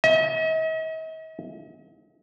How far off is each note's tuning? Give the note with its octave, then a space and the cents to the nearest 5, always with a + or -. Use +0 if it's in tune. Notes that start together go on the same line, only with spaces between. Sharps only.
D#5 +45